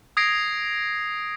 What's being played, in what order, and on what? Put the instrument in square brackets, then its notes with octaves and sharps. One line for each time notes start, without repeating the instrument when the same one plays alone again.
[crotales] D#6 G#6 A#6 C7 D7